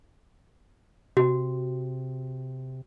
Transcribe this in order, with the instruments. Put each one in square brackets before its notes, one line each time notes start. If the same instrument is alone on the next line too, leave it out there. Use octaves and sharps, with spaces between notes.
[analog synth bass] C3 [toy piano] F#4